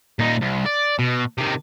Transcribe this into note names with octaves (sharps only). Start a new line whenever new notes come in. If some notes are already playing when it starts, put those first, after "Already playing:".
A#2 D#4
C2
D5
B2
C3 D#3